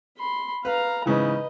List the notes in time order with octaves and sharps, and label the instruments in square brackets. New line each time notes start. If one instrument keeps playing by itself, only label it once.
[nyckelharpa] B5 C6
[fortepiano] B4 [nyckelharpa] F5 A#5
[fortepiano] G#2 C#3 E3 [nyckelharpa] B4 D#5